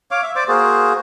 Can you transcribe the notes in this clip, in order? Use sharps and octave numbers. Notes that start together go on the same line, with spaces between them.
C#5 F5 D6
E5
C5 D5 D6
A#3 F#4 G#4 C5